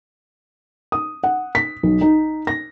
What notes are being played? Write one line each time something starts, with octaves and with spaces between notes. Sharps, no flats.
D#6
F#5
B6
B1
D#4
A#6